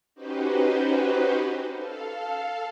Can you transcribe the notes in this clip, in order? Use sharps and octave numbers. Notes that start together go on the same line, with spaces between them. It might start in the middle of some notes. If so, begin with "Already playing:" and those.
C#4 D#4 F#4 G4 B4 C5
A4 F5